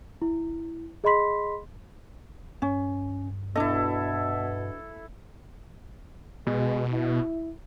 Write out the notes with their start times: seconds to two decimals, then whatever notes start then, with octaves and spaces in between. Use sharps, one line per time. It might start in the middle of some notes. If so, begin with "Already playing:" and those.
0.22 E4
1.04 G#4 D#5 B5 C6 B6
2.62 G2 C#4
3.55 B2 D4 E4 A4 D#5
6.47 B2 G#3
6.92 E4